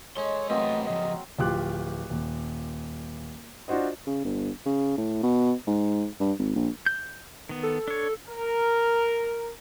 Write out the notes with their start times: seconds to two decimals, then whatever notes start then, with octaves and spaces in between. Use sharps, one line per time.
0.17 G#3 A4 C#5 C6
0.50 F#3 A3 A#3 C4 B4 D#5
0.87 F3 G#3 D#5
1.39 D1 F3 F4 G4 D6 F#6
2.10 D#1
3.68 D4 F4 F#4 C5 D#5
4.07 C#3
4.24 G1
4.65 C#3
4.98 A2
5.23 B2
5.67 G#2
6.20 G2
6.38 G#1
6.55 A#1
6.86 G6
7.49 D#3 B3
7.63 A4
7.88 D4 C#5
8.29 A#4